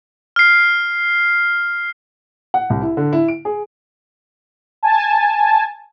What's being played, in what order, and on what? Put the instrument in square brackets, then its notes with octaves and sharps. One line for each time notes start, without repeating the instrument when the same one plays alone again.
[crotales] F6 C7
[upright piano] F#5
C2
E4
D3
E4
D7
G#4
[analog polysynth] G#5 A5